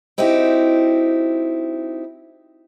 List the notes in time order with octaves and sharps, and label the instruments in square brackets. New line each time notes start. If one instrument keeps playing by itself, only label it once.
[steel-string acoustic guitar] C4 D#4 E4 F#4 G4